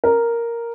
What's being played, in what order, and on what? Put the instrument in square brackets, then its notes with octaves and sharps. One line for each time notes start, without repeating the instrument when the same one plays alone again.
[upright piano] A#4